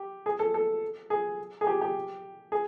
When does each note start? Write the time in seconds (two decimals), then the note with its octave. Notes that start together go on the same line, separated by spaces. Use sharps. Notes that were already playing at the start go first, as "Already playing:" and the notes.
Already playing: G4
0.26 G#4
0.39 A4
0.54 A4
1.10 G#4
1.61 G#4
1.67 G4
1.81 G4
2.52 G#4